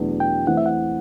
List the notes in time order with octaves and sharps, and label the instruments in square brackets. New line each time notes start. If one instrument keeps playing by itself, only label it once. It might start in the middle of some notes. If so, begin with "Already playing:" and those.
Already playing: [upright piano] E2 B2 F#3 A3 D4
[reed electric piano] G5
[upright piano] E3 A3 C4 [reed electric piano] F#5
[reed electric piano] E5
F#5